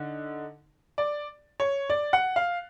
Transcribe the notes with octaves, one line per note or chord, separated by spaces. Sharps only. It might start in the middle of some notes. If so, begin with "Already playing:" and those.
Already playing: D3 D#4
D5
C#5
D5
F#5
F5